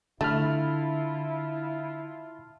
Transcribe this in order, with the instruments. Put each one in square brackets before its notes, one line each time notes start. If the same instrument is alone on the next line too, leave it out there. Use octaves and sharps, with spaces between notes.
[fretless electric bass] D3 [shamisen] A3 [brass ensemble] E4 F4 [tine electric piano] A5 B5 F6